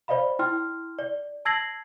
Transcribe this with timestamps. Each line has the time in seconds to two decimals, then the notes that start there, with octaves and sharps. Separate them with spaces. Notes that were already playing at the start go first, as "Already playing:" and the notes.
0.08 C5 D5 D#5 F5 B5
0.39 E4 G5 C6 F6
0.99 D5
1.45 A5 E6 G#6 A#6 C7 F#7